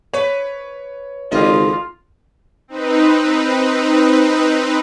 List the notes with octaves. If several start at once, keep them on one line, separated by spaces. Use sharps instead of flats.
B4 C#5
G#1 C#3 F4 D#5
C4 D#4 B4